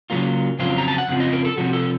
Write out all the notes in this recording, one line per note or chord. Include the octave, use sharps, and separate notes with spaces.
C#3 F#3 A#3 F4
F2 C#3 F#3 C4 F4
A#5
A5
F#5
F2 C#3 C4 F4
D#5
A#4
A4
C3 F3 C4 F#4
A4